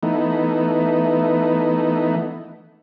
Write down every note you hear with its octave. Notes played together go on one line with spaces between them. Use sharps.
E3 A3 B3 D#4